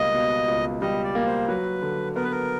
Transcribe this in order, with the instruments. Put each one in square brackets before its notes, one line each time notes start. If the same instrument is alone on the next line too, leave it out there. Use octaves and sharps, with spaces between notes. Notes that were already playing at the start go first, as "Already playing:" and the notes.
Already playing: [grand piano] C#2 B2 G3 A#3 [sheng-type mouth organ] D#5
[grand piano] B2
C#2
[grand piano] G3 [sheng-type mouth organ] D#5
[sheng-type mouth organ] D5
[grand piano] A#3
[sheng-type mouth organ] C5
[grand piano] F#3 [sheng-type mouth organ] B4
[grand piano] D3
[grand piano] B3 [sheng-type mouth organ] A#4
[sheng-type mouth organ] B4
A#4